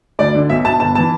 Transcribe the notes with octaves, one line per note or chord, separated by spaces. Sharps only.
D2 D5
D3
B1 E5
B2 A5
G1 A5
E3 A5